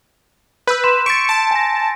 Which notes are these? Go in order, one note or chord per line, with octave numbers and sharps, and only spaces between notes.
B4 E6 G6
C6 B6 E7
C#6 A6 C#7 D7
A5
G#5 A#6